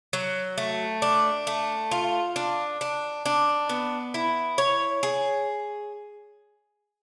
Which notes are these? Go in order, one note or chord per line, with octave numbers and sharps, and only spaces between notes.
F#3
A3
D4
A3
F4
D4
D4
D4
B3
E4
C#5
G#4